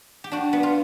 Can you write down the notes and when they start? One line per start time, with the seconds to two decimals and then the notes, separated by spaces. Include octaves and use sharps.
0.24 G4
0.32 D4 F#4
0.53 B3
0.63 F4